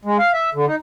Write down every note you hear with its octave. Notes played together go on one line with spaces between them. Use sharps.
G#3
F5
E5
D3
D#4